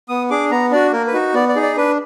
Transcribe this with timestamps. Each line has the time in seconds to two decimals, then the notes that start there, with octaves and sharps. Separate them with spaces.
0.09 B3 D#6
0.30 D4 G#4 D6
0.51 B3 A#5
0.71 D4 F#4 D5
0.93 A#3 A#4
1.07 B4
1.13 D#4 F#4
1.34 B3 D5
1.49 D5
1.55 D#4 G#4
1.62 D5
1.77 D4 B4